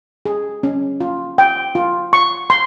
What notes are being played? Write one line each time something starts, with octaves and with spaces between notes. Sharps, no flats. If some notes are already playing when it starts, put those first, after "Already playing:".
G#4
C#4
F4
G5
F4
C#6
C6